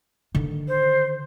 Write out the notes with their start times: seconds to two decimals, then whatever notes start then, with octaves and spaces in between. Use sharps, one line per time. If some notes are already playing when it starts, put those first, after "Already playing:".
0.35 D3 D#3
0.68 C5